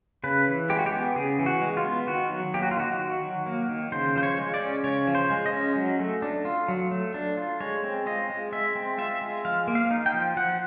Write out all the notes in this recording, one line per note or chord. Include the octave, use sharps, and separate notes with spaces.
C#3 B4
E3
G#3 G4
F#4
G4
B3
C#3 G#4
E3
F#4
G#3
F4
B3
D#3 F#4
F#3
A#3 G4
F#4
F4
D#3 F#4
D#3
F#3
A#3
D#3
C#3 C5
F3 C5
C#5
G#3
D5
C#4
C#3 C#5
F3
C5
G#3
D#5
C#4
F#3
A3
D4
F4
F#3
A3
D4
F4
G#3 C#5
C4
F4 D#5
G#3
G#3 E5
C4
F4 E5
G#3
F3 F5
A#3
F5
D#4
G5
F3
F3 F#5